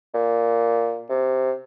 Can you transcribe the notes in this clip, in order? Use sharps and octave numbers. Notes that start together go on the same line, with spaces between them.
A#2
C3